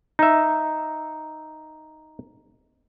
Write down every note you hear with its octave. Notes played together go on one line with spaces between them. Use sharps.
D#4 E5